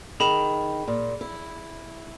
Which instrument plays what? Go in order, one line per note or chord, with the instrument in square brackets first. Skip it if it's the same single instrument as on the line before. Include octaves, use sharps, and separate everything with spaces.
[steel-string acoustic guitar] D#3 [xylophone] G#4 B5 E7
[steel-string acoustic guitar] A#2
E4